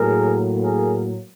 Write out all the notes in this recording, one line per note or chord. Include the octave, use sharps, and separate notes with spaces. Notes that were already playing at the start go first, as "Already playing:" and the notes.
Already playing: A2 F#3 A#3 G#4 A#4
G#4 A#4